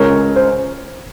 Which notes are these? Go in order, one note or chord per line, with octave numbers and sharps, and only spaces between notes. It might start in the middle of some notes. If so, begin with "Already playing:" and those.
Already playing: C#2 C#3 G#3 A#4 C#5
C5